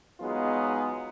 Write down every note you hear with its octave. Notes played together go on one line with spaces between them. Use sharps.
F#3 G#3 B3 D#4 F4 G#4